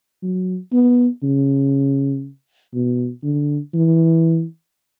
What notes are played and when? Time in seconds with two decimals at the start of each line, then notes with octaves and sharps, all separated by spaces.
0.23 F#3
0.73 B3
1.23 C#3
2.74 B2
3.24 D3
3.74 E3